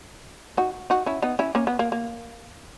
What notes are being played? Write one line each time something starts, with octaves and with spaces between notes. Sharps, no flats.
D#4 F#4
D#4 F#4
C#4 E4
B3 D#4
C#4 E4
A#3 C#4
B3
A#3
A#3